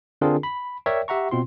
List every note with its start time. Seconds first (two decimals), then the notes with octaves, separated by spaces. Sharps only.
0.21 D3 C4 D4 F4 G#4 A#4
0.43 B5
0.86 A#4 C#5 D5 E5 G5
1.08 G4 E5 F#5 A#5 C#6
1.31 B2 C4 F4 C6